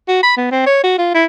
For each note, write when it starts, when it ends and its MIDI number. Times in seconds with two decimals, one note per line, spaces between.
0.08 0.23 66
0.23 0.33 83
0.37 0.50 59
0.51 0.63 60
0.66 0.82 73
0.84 0.95 66
0.98 1.11 65
1.14 1.25 64